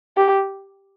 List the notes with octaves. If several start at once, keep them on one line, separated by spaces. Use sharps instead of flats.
G4